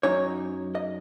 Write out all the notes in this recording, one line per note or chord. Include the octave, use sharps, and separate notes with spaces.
F#2 F#3 D#4 C#5
D#5